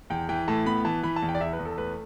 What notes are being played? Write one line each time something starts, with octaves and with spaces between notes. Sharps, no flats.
E2 G5
E3 G5
A2 A5
B3 B5
E3 A5
E3 B5
A5
E2
G5
D5
E2 E5
B4
E2
A4
A3 B4